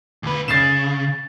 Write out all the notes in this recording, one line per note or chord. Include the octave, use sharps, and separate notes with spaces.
D2 B4
C#3 A6 C7 E7